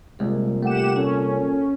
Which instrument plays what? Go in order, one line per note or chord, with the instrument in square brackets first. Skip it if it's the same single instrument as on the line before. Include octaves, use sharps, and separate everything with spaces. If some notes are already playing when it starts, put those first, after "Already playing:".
[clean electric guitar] C2 [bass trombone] A#2 [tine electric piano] G#3
[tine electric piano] A3 [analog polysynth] G4 F#5 E7
[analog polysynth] C#4 [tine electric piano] A4